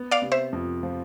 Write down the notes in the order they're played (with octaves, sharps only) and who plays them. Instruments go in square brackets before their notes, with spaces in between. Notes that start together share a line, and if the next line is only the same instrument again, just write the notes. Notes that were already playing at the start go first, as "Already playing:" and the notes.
Already playing: [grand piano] B3
[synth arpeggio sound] D5 F5
[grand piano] C3
[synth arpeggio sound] C5 E5
[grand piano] F2
F3